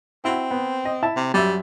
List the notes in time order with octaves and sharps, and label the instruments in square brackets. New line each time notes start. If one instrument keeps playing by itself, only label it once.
[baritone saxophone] C4 [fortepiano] E4 F#4
[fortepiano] B3
D#5
E4 E5 A5
[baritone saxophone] C3
[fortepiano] F#2 E5 [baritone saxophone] G3